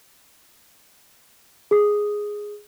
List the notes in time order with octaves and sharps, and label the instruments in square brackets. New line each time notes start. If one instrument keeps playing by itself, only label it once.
[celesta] G#4 D#6